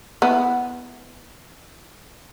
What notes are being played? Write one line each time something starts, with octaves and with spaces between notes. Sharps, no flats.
B3 E4